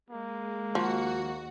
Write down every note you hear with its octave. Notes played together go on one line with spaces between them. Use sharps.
G#3 A#3
D#2 F3 F#4